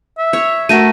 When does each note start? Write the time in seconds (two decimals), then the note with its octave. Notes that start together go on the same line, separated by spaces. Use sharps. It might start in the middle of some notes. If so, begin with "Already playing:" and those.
0.18 E5
0.33 C#5
0.69 A3 F#4 A#4 F#5 A#6 D#7